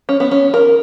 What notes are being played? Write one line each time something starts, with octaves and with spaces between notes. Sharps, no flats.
C#4
B3
C#4
A#4